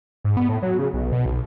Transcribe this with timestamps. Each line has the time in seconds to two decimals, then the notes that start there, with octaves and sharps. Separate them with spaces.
0.24 G#2
0.37 B3
0.49 A2
0.62 F#3
0.79 C#3
0.94 B1
1.12 B2
1.26 B1